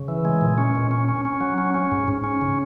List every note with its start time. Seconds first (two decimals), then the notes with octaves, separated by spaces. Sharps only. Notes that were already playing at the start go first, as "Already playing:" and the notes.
Already playing: C#3
0.08 E3
0.25 G#3
0.41 A#2
0.58 C#4
0.75 A#2
0.91 C#4
1.09 C#4
1.25 C#4
1.41 F#3
1.58 C#4
1.74 C#4
1.92 G#2
2.08 G#2
2.24 C#4
2.41 C#3